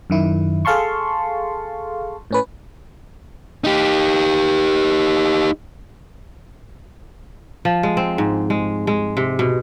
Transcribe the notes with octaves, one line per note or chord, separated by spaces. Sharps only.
F#2 D#3 E4
G#4 A4 F5 A5 C6 C#6
A2 C#4 B4
D#4 G4
F3
G#3
C4
G#2
G#3
G#3
C3
B2